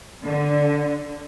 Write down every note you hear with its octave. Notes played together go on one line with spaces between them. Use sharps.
D3